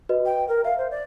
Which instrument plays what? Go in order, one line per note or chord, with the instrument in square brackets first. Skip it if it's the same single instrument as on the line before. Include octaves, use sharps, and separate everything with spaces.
[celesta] F#4 B4 D#5
[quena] G5
A#4
[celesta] E5 [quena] F5
[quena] C5
D5